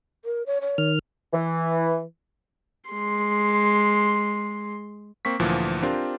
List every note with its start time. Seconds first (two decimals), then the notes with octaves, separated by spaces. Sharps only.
0.25 A#4
0.46 C#5
0.61 C#5
0.78 D#3 F6
1.33 E3
2.91 G#3 C6
5.25 A#3 C4 C#6 B6
5.40 D2 A#2 E3 F3
5.82 C4 D4 F4 G4 A#4